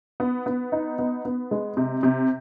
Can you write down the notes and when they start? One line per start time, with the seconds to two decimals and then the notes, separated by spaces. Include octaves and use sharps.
0.20 B3
0.46 B3
0.72 D#4
0.99 B3
1.25 B3
1.51 G#3
1.77 C3
2.03 C3